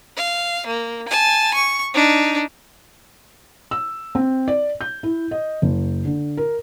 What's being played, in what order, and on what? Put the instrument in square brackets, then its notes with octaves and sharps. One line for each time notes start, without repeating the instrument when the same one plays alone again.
[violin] F5
A#3
G#5 A5
C#6
D4 D#4
[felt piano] E6
C4
D5
G6
E4
D#5
F#1
D3
A#4